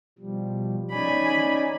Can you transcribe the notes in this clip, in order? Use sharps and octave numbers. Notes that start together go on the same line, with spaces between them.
B2 F3 G3
C#4 D#4 D5 G#5 B5